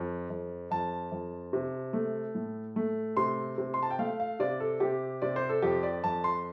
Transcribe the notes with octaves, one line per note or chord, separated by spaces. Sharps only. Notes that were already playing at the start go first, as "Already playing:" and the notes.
Already playing: F2
F2
F2 A5
F2
C3
A3
A2
A3
C3 C6
C3
C6
A5
G5
A3 F5
F5
C3 D5
A4
C3 G4
C3 D5
C5
A4
F2 G4
D5
F2 A5
C6